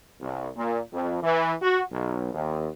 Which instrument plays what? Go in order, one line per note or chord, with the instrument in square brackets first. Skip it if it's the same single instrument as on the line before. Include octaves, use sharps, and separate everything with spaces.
[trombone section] C2
A#2
F2
E3
F#4
B1
D#2